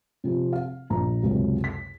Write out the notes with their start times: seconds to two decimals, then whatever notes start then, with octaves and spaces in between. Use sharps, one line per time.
0.24 C3 F3 C4
0.53 F5
0.90 A#1 A#5
1.23 C#2 F#2 C3
1.64 B6